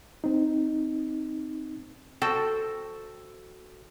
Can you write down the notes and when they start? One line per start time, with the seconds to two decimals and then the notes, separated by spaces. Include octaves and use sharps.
0.24 C4 D#4
2.22 F#4 A4 C5 G5